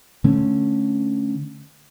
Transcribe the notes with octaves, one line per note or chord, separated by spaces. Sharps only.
D3 A3 C#4